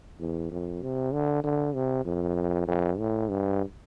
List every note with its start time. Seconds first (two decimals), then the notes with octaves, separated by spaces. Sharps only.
0.20 E2
0.51 F2
0.82 C3
1.13 D3
1.43 D3
1.74 C3
2.05 F2
2.67 F2
2.98 A2
3.29 G2